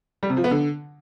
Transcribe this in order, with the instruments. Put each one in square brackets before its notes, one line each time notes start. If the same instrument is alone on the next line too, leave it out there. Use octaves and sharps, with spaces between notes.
[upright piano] G3
C3
F3
B3
D3